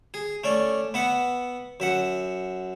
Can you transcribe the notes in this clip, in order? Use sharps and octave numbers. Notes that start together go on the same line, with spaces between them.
G#4
A3 C#4 D5
B3 E5 F#5
F#2 E5 F#5